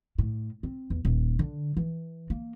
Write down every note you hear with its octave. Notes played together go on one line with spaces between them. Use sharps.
A2
C4
E2
D#1
D3
E3
A#3